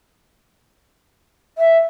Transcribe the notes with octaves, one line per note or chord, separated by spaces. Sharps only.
E5